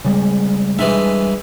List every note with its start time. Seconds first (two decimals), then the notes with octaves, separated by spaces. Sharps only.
0.05 C#3 G3 G#3
0.79 G2 E3 G#3 E5